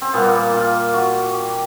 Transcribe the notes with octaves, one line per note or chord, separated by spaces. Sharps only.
C4
A#2 G3 A#3 B3
F4
F#4
G4